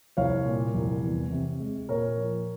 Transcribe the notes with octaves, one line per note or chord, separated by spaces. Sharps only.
C2 C#5 F5
A#2
C2
E2
C3
G#3
A#2 A#4 C#5
F3